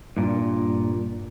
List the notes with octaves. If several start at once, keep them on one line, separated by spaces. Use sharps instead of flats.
G2 A#2